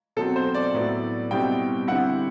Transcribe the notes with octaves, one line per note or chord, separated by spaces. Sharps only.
B2 F#3 C4 A4
C5
D5
A2 F#3 B3 E4
B2 G3 C4 E4 G5
D3 G3 C4 E4 F#5